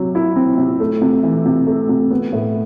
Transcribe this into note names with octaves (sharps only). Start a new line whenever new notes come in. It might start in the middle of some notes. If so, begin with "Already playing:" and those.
Already playing: C3 F#3
E4
C4
C3
A3
C3
E3
C3
A3
C3
B3
A2